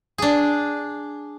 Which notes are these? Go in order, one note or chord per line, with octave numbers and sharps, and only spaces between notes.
D4 G#4